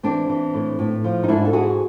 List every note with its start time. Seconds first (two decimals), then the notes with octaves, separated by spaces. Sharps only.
0.03 E3 C4 D4
0.29 E3
0.54 A2
0.79 A2
1.04 F3
1.24 D#4
1.28 G#2 D4 E4
1.45 A4
1.53 G#2 F#4 G#4